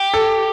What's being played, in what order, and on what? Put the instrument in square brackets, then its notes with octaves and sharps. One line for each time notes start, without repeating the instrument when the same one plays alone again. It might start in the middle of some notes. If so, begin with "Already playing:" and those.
Already playing: [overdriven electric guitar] G4
[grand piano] A4